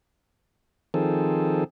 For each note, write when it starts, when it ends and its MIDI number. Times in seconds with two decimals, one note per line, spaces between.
0.94 1.64 51
0.94 1.64 53
0.94 1.64 60
0.94 1.64 68
0.94 1.64 69